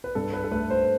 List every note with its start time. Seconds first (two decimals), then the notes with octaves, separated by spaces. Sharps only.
0.04 B4
0.15 G2 A4
0.33 B4
0.44 A4
0.51 A3 B4
0.70 C5